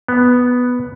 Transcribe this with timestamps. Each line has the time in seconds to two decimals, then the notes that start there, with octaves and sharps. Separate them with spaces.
0.08 B3